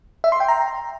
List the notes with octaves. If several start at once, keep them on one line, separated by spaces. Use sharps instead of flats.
E5
C6
G5
A#5